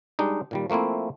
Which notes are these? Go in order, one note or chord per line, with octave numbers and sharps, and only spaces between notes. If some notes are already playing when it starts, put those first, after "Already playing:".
G3 G#3 D4 D#4
A#2 D#3 G3
F3 A3 A#3 C4 E4